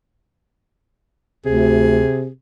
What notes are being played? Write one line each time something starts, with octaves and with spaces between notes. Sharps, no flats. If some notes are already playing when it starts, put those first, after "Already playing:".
D2 C3 G#4